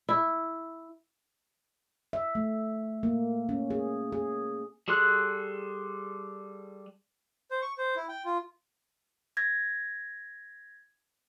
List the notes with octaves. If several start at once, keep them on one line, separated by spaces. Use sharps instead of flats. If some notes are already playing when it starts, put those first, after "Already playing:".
E4
E5
A3
A#3
C#4
G#4
G#4
G3 G#4 A4 C6 F#6
C5
C#6
C5
E4
G5
F4
G#6 A#6